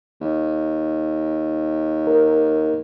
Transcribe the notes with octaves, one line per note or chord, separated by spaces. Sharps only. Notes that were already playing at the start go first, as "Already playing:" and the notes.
D#2
A#4